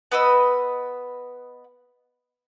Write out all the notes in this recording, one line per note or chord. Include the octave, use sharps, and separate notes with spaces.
B3 B4 D#5 E6